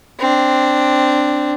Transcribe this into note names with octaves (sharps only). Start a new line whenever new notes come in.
C4 D4